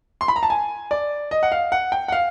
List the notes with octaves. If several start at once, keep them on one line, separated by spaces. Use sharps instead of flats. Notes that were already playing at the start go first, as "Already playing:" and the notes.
C6
B5
A#5
A5
G#5
D5
D#5
F#5
F5
F#5
G5
F#5
F5